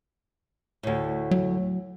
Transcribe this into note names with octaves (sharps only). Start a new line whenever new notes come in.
D2 A2
F#3